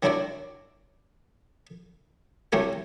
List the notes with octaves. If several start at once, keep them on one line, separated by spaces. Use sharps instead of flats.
D#3 F#3 D4 E4 F#4 D5
C2 F#3 A3 G4 A#4 G#5